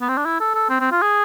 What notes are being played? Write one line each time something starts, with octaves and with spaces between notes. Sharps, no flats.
B3
C4
D4
E4
A4
A4
C4
C4
F4
G#4